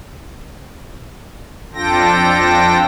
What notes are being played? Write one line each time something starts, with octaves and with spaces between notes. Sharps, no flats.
F2 D4 F4 A4 G5 A#6